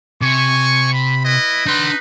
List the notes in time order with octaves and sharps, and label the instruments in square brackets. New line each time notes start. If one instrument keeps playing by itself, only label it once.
[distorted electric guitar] C3 [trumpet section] G#5 C#6
[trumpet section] B5
E4 B4 D#5
[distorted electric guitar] D4 C6 [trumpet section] D#4 B4